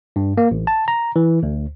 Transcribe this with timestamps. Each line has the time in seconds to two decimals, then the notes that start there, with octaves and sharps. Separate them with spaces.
0.16 G2
0.37 A#3
0.51 A1
0.67 A5
0.88 A#5
1.16 E3
1.43 D2